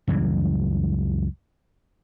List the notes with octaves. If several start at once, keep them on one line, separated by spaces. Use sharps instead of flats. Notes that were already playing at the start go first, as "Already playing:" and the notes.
C#2 F#2 E3 G3